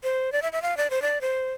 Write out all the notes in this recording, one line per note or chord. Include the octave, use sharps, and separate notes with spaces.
C5
D5
E5
E5
F5
D5
C5
D5
C5